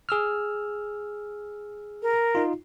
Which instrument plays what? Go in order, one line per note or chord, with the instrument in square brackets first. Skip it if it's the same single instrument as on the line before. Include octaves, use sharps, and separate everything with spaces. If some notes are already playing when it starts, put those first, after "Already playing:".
[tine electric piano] G#4 E6 F6
[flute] A#4
[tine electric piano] D#4 F4